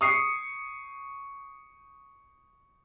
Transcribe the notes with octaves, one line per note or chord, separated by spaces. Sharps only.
C#6 D#6 C7 C#7